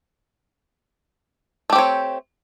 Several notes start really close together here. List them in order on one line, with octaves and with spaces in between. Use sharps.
A3 G4 C4 C#5